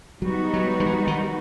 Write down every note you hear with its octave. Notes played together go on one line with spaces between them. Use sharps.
F#3 G3 B3 D#4 F#4
F#3
F3
E3
D#3